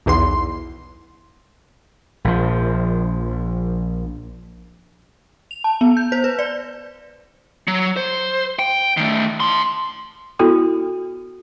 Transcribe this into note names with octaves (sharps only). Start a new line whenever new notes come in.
B1 E2 C6
A#1 F3
F7
A5
B3
G6
C5
B4
D5
F#3
C5
G5
D#3 A3
A5 C6
B3 E4 F#4 A4